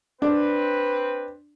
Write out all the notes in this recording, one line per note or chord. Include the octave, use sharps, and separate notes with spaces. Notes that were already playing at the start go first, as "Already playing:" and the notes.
C4 D4 B4